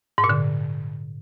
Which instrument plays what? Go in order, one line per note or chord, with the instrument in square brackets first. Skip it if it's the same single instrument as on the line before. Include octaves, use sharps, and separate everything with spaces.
[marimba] G#2
A#2
D3